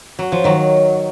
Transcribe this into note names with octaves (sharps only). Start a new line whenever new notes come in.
F#3
F3
D#3 F#3